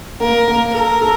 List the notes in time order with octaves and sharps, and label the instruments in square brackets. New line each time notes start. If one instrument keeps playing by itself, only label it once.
[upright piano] A#3 [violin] A#4
[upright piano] A#3
[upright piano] A4 [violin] A#4
[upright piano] A4